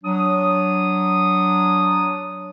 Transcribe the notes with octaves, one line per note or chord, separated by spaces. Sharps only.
F#3 D4 D#6